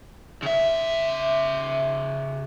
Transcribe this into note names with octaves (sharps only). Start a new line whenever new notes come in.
C#3 E5